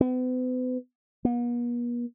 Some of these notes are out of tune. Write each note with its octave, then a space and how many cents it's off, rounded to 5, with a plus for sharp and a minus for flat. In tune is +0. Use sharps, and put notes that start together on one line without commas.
B3 +40
B3 -45